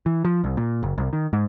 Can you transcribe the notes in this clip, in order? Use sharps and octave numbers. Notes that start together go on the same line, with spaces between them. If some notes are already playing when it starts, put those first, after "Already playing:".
E3
F3
C2
A#2
F#1
C2
D#3
G#2